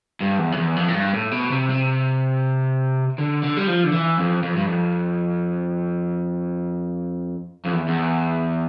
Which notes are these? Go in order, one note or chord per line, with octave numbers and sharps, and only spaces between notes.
G2
E2
F2
E2
F2
A2
G2
A2
B2
C3
C3
D3
D3
G3
F3
D3
E3
F2
F2
G2
F2
F2
E2
E2